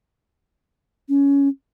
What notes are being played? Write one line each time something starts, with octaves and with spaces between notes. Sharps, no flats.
C#4